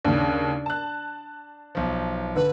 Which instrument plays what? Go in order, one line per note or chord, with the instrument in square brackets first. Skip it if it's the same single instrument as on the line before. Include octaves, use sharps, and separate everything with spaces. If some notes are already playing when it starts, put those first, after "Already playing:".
[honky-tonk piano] D#2 C#3 [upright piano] D4
[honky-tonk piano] A5 F#6
[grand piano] B1 F3
[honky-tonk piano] D3 [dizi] B4